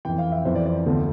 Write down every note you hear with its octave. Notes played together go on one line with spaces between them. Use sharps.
F2 E3 G5
F5
E5
F2 E3 C5
D5
D5
D2 D3 F3